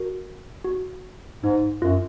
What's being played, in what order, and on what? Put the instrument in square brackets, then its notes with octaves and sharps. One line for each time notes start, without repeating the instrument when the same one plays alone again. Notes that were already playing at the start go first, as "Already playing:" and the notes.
Already playing: [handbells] F#4 A#4
F#4
[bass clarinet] G#2 [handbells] D#4
[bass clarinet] F#2 [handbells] F4